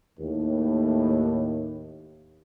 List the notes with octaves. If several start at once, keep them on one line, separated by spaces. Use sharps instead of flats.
D#2 A2